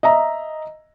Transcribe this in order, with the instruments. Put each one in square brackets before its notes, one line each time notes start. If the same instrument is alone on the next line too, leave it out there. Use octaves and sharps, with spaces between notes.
[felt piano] D#5 E5 A#5